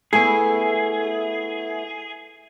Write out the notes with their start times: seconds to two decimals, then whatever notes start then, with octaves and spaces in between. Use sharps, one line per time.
0.13 A3 B3 E4 G#4